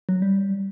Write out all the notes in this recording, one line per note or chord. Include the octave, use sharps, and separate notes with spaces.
F#3
G3